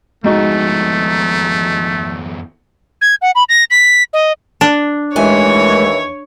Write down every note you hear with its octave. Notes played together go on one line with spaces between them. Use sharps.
F2 G#3 A3 B3 D#4 F#4
G#6
F#5
B5
A#6
B6
D#5
D4
D#2 E3 G#3 A3 C#5 G#5